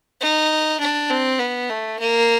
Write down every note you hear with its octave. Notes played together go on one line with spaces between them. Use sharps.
D#4
D4
C4
B3
A3
A#3